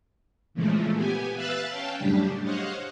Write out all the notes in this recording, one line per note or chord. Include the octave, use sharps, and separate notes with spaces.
A#2 C#3 E3 F3 G#3 A3
B3 G4 G#5
B4 E5 F5 E6 F#6 A6
C#4 F5 G5 A5
F#2 A2 C#3 G3 D4 G4
C5 C#5 D#5 F5 F#5